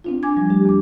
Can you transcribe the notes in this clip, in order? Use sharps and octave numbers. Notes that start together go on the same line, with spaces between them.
C4 D4 F4
G#5 D6 G#6
F3 G3
A3 D4 G4
E2 D6